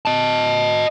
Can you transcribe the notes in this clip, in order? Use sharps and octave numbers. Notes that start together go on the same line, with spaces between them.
D#5 A5